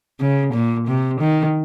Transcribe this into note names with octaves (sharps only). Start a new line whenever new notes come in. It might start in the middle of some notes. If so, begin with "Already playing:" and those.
C#3
A#2
C3
D#3